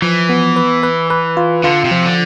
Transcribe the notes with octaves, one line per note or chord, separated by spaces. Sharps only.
E3 F3
B3
B4
B4
B4
F4
D3 F4
C3
F3
D3